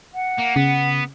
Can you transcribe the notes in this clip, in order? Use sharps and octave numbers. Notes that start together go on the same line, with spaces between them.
F#5
A#3
C#3 B3